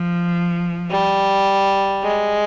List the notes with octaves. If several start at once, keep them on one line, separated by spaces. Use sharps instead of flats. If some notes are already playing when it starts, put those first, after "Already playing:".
Already playing: F3
G3
G#3